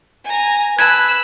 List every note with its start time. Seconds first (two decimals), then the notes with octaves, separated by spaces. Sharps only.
0.25 G#5 A#5
0.79 B4 A5 E6 F#6 G#6